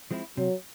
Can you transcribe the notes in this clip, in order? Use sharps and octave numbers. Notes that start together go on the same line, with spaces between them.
F3 G#3 C4 E4
C3 F#3